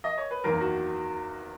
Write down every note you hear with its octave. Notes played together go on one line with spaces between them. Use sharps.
D#5
C#5
B4
F#1 E2 D#3 A#3 A#4
F#4